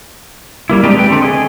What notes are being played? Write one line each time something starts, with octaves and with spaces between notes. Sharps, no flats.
G3 A#3 E4
G#3 C4 D4 D#4 G4 D5
B4 G5
D3 A3 C4
G#4 D#5